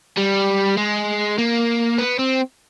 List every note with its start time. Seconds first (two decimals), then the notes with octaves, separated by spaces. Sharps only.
0.17 G3
0.77 G#3
1.38 A#3
1.99 B3
2.19 C4